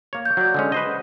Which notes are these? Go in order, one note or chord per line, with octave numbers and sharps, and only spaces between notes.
A#3 C#5
G6
F#3 D5
D3 G#3 C#4
B4 C5 D#5